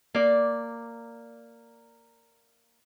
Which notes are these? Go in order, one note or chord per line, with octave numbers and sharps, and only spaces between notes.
A#3 D5